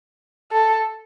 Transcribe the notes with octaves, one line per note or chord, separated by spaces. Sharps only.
A4